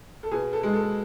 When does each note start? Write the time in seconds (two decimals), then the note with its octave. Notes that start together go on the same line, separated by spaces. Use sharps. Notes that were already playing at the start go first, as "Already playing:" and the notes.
0.23 A4
0.31 B2 G#4
0.53 A4
0.63 G#3
0.74 A4